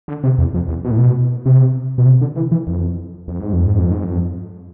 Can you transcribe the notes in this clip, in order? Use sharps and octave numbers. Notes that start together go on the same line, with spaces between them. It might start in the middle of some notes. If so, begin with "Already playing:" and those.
D3
C3
E2
F2
E2
B2
A2
B2
C3
B2
C3
D3
E3
E3
F2
F2
G#2
F2
G#2
F2
G#2
F2